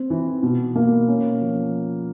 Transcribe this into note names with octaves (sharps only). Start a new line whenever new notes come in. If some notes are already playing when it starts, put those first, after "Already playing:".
Already playing: C4
E3
B2
A#3
C#4
F3